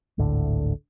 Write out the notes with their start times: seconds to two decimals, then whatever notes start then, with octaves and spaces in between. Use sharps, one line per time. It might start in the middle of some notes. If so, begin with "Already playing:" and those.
0.18 G#1 D2 A2 D3